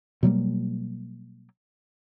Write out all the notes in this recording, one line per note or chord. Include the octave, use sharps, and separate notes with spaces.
B2 F#3 G3 A#3